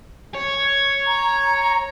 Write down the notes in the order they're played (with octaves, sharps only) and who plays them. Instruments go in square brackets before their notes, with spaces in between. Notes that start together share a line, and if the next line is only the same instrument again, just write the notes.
[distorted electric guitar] C#5
[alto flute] A#5